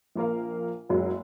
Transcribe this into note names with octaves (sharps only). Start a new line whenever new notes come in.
A#1 A#3 A#4 F5
F#1 B1 F#3 G#3